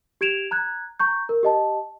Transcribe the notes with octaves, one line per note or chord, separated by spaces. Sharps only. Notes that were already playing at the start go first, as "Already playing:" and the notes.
G4 G#6 D7 E7 F7
A#5 F#6 G#6
A#5 C#6 G6
A#4
G4 D#5 A5